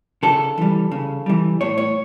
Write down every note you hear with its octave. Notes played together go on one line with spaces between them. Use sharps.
C#3 A4
E3 G3
C#3
E3 G3
A2 C#5
C#5